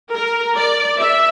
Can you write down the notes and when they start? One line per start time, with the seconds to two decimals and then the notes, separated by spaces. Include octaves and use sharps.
0.13 A#4
0.56 D5
1.00 E5